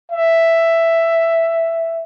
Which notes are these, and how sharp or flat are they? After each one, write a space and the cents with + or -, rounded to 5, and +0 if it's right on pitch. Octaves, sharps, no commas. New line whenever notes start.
E5 +5